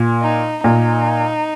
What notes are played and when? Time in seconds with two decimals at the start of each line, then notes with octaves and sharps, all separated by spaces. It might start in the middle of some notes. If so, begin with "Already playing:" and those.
Already playing: A#2
0.23 D#4
0.64 A#2 D#4